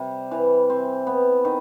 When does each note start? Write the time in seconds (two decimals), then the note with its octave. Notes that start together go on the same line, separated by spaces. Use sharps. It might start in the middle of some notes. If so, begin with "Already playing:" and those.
Already playing: C3 G3
0.31 E3
0.70 C4
1.07 B3
1.45 D#3